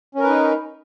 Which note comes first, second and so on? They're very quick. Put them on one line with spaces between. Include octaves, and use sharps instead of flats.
C#4 A#4 B4 D#4